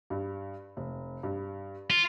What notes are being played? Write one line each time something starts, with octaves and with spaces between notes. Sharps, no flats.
G2
F1
G2
F4